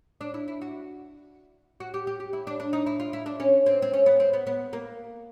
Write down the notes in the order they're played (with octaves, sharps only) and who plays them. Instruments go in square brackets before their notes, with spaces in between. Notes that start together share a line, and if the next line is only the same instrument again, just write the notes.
[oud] D4
E4
E4
F#4
F#4
G4
G4
G4
E4
D4
D4
D#4
E4
F4
E4
D4
C#4
C4
C4
C#4
B3
C4
B3
B3
A#3